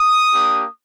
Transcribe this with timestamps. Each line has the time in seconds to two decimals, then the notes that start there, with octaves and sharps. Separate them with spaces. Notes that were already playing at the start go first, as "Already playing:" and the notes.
Already playing: D#6
0.33 A#3 D4 G4